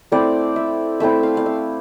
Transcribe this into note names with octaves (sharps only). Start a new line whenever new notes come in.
A3 C4 E4 D5
E5
A3 C4 E4 E5
F5
F5
E5